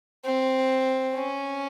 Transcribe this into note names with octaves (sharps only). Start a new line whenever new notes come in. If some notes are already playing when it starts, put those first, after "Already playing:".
C4
C#4